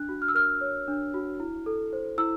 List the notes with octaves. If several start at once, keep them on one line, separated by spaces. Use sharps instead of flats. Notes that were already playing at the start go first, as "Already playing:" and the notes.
Already playing: D4 F#6
F#4
F6
E6
A#4 F6
C#5
D4
F#4
E4
A4
C5
E4 E6